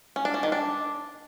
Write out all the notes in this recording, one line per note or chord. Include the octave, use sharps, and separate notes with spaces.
C#4
D4
C#4
D#3
D4